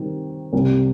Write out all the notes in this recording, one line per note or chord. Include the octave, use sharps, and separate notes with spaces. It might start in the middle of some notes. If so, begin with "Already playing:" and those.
Already playing: D#3 G3 C4
C2 C3 G3